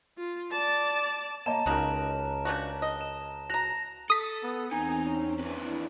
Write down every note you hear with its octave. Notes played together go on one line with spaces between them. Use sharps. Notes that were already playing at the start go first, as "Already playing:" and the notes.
F4
D5 A5
A#3 C#5 D#5 A5 A#5 E7
C#2 C#4 D#4 F#4 A#4
C#3 D4 F#4
D#5
E7
F#4 A#5 A#6 F7
A4 D#6 B6
B3
E2 C4 D#4 G#5 A#5
C#4
D#2 D4 E4 B4